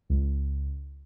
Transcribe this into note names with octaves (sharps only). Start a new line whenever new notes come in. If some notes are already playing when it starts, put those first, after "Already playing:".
C#2